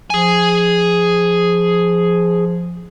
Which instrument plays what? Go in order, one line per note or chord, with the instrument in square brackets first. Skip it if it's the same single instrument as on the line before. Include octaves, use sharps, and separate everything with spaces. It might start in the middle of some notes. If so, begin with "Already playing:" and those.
[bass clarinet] F3 [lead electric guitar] G#4 G#5